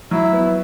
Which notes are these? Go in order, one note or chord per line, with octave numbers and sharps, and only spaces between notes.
F#3 E4
B3